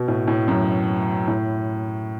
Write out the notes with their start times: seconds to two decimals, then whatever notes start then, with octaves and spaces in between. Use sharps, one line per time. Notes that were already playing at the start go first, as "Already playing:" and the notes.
Already playing: B2
0.08 A2
0.28 A2
0.48 F#2
1.28 A2